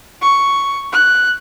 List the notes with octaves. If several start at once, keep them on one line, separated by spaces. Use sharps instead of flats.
C#6
F#6